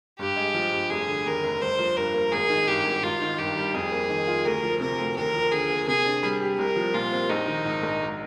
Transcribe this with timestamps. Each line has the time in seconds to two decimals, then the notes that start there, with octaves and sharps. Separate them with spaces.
0.19 G2 G4
0.36 G#3
0.54 F3
0.72 G2
0.90 F1 G#4
1.08 D3
1.25 D#2 A#4
1.43 F1
1.61 G1 C5
1.79 F3
1.97 G2 A#4
2.14 A#3
2.31 G#1 G#4
2.49 D#3
2.67 G2 G4
2.85 G#1
3.03 G#1 F4
3.21 D#3
3.39 G2 G4
3.56 G3
3.74 F2 G#4
3.91 A#3
4.10 D#3
4.27 F4
4.45 D2 A#4
4.63 F3
4.80 C3 A#4
4.98 D2
5.16 D#2 A#4
5.34 F3
5.52 D3 G#4
5.70 A#3
5.87 C3 G#4
6.05 D4
6.23 G3
6.41 G4
6.58 C2 A#4
6.76 F3
6.94 A#2 F4
7.12 C4
7.29 A#1 D#4
7.47 D#3
7.65 G#2
7.83 A#1
8.01 G#1